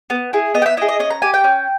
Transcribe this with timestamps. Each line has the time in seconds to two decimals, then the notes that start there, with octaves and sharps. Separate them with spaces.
0.10 B3
0.33 E4 G#4
0.55 B3 D#5
0.62 G5
0.66 E5
0.77 E4 D#5
0.82 G#4
0.88 D#5
0.99 C#4 D#5
1.10 A#5
1.22 G4 G#5
1.34 G5
1.44 C#4